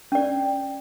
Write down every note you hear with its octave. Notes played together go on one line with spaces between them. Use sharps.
C#4 D5